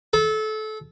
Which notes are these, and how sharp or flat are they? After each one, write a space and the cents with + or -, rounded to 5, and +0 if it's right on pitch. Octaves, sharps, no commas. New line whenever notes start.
A4 -25